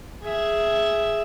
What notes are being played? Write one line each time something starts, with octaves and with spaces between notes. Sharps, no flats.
G#4 E5